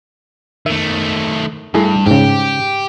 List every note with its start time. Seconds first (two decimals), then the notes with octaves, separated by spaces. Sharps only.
0.66 D#3 A3 E5
1.74 G2 A3 E4 G#4
2.06 G#2 C#3 G4